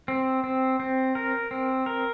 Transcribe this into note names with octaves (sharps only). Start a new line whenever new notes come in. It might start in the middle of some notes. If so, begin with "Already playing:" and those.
C4
C4
C4
A#4
C4
A#4